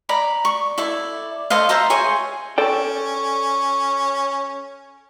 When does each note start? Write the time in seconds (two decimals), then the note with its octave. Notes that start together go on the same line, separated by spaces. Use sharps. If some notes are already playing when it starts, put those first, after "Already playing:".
0.09 D5 A#5 B5
0.45 C#6
0.78 E4 A4 D5
1.50 A4 C5 D#5 F5
1.69 C5 E5 A5 A#5
1.90 G#4 C#5 G#5 C6
2.58 C#4 A4 D5 G5